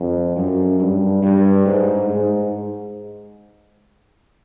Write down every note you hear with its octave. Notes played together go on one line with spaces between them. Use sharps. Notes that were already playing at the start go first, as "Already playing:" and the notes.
Already playing: F2
F#2
G2
G2
G#2
G#2